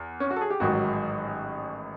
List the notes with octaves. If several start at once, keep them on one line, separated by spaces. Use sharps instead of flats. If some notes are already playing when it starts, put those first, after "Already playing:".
Already playing: E2
C#4
F#4
A4
G#4
G4
A1 G#2 D#3 F#3 F#4